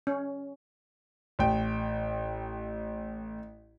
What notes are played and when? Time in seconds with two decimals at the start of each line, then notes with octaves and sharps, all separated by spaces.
0.07 C#4
1.39 A1 G5